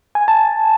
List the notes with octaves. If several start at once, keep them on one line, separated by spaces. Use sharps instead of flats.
G#5
A5